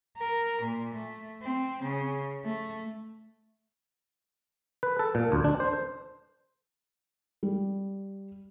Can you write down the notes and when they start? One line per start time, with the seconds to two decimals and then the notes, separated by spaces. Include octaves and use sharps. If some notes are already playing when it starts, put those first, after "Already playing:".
0.17 A#4
0.61 A#2
0.94 A3
1.42 C4
1.83 C#3
2.44 A3
4.83 B4
4.99 A4
5.15 A#2
5.32 D2
5.44 D4
5.60 C5
7.43 G3